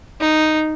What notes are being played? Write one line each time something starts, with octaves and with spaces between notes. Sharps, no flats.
D#4